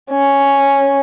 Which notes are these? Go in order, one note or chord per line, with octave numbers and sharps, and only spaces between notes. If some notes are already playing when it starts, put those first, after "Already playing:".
C#4